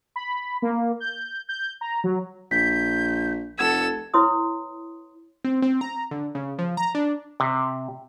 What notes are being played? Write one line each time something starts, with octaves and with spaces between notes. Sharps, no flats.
B5
A#3
G6
G6
A#5
F#3
A#1 G6 B6
F1 A4 F#5 E6 G#6
E4 B4 C#5 C6 D#6
C4
C4
A#5
D3
C#3
F3
A#5
D4
C3